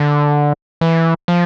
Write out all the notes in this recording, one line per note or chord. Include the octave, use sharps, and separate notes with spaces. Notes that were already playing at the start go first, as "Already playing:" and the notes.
Already playing: D3
E3
F3